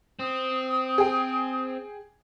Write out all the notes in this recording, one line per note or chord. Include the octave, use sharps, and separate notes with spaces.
C4 D#6
G#4 G5